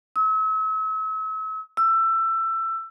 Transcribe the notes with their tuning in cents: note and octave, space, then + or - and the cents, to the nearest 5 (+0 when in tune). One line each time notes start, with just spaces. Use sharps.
E6 -40
E6 +20